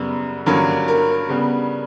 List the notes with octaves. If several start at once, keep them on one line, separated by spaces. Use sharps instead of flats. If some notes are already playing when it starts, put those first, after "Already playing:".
Already playing: F#2 C#3 G3 B3
G2 D3 F#3 A#3 C#4 A#4
A#4
C#3 G3 B3